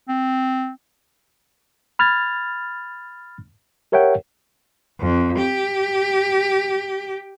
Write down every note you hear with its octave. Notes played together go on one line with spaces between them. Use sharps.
C4
B5 F6 G#6 A6
G4 A#4 C#5 E5 F#5 G5
F2
G4